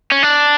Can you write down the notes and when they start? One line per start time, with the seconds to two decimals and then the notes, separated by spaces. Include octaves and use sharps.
0.12 C#4
0.23 D4